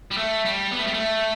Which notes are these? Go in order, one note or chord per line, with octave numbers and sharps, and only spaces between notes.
G3
A3
G3
B3
A3
G3
A3